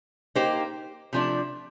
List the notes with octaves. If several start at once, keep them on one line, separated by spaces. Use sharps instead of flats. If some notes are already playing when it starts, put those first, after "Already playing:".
A#3 D#4 G4 C5
C3 F3 A3 D4